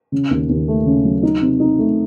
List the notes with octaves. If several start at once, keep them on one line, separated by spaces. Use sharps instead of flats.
C#3
D#2
D#2
A3
C#3
F#3
D#4
C3
D#4
A3